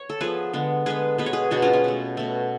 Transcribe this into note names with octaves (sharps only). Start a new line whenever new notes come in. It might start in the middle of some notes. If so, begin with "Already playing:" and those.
Already playing: C#5
A4
F3 B3 G#4 B4
D3 G#3 B3
D3 G#3 B3 G#4 B4
B2 G#3 B3 B4
C#5
G#4 B4
B2 G#3 B3 D4 F#4
C#4 F4
C#4
B2 A3
B2 A3